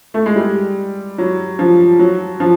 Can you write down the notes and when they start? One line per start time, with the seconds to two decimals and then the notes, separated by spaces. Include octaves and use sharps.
0.14 A3
0.26 G#3
0.36 G3
1.18 F#3
1.59 F3
1.99 F#3
2.40 F3